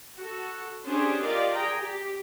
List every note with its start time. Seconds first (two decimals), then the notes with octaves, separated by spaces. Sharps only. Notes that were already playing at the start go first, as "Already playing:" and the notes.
0.18 F#4 A4
0.85 C#4 D4 G4 G#4 C5
1.21 F4 G4 A#4 D5 D#5 F5
1.53 G#4 G5 A#5
1.83 G4